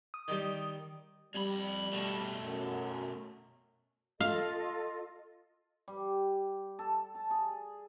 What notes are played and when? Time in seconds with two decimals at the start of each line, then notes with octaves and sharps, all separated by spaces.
0.14 D#6
0.28 D#3 G3
1.34 F2 G3 B5
1.93 B2 A3
2.42 F#2
4.20 F4 A4 D#5 F5
5.88 G3
6.79 A4
7.15 A5
7.31 G#4